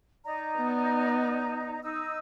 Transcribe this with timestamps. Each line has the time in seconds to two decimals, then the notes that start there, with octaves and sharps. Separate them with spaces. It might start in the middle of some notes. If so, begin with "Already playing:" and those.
0.24 D#4 D5 A#5
0.57 B3
1.83 D#4 E6